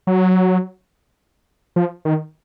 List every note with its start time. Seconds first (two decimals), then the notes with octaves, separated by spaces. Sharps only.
0.07 F#3
1.76 F3
2.05 D#3